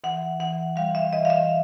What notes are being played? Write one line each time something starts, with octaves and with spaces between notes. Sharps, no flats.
E3 F#5
E3 F#5
G3 F5
E5
E3 D#5
F5
E5